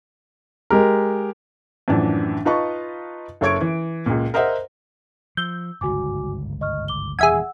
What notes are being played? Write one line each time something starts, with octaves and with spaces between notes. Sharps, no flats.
G#3 G4 A#4
F#2 A2 E3 F3 D4
D#4 F4 B4 D#5 A5 C#6
F#1 A4 C#5 C#6 G#6 D7
E3
C#2 A#2
A#4 C5 D#5 E5 F#5
F3 E6 G6
G1 C#2 G#2 F#4 G#5 D6
D#5 C#6 F6
D6 G7
D#1 E2 C3 G#4 E5 F#5 G#5 E6